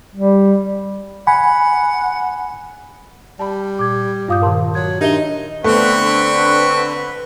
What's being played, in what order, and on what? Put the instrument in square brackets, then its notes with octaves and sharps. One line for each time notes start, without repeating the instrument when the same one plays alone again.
[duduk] G3
[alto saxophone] F#5 [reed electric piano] G#5 B5
[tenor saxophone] G3 [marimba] A5 B5
[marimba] A#2 [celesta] D6 G#6
[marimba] G2 D6 G6 [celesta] F4 F5 D#6
[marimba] A#2 D#3 [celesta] A#4 A5 C6
[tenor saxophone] F#3 [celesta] G#6
[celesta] D4 E5 G7 [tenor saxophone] D#4 [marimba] G4 A#4 D#5
[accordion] D3 [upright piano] A3 B3 A4 [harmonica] C4 C#6 [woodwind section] B4